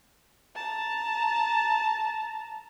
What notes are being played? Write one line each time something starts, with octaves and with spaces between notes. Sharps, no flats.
A5 A#5